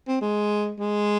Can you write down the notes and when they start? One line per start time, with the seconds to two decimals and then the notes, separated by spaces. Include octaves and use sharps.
0.08 C4
0.21 G#3
0.79 G#3